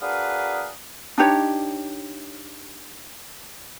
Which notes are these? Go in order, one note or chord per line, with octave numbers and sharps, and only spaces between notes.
D4 F#4 G#4 A#4 B4 F5
D4 D#4 G4 C#5